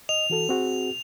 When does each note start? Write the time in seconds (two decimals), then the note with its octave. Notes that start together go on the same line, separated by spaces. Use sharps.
0.09 D#5 F7
0.30 E3 F#4 A4
0.49 C4 F#4 G#4